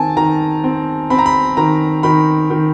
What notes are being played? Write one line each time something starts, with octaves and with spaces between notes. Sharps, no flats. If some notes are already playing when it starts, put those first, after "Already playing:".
Already playing: D#3 C4 G#5 A5
D#3 A#5
C4
C4 B5
A#5
B5
D#3 A#5
D#3 B5
D#3